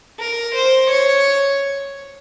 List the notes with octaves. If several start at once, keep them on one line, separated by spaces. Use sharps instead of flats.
A#4
C5
C#5